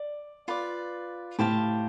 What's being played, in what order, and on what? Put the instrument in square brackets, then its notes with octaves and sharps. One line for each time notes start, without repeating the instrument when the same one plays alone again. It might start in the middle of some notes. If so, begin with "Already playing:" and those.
Already playing: [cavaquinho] D5
F4 B4 D5
[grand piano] A2 [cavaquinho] G4 C5 F5 A5